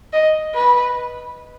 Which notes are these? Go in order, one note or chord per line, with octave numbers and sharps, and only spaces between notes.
D#5
B4